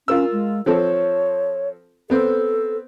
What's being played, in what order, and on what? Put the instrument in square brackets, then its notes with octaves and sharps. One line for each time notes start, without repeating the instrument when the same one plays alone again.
[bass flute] C#4 [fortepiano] F4 A#4 E6
[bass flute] G#3
[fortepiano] F3 C4 A4 [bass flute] C#5
[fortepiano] B3 C4 C5 [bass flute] A4